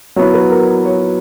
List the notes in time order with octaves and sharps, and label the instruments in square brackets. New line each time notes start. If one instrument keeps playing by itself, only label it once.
[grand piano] F#3 B3 E4 [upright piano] C#5
[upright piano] B4
A#4
C#5